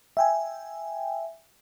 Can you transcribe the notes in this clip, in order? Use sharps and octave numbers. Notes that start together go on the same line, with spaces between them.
E5 G5 G#5